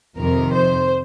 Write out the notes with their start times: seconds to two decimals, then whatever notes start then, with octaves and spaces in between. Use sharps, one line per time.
0.17 F2 C3 D#3 A#4
0.52 C5